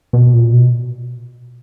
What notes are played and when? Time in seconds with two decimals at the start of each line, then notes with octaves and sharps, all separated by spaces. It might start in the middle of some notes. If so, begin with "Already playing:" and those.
0.13 B2
0.34 A#2
0.53 B2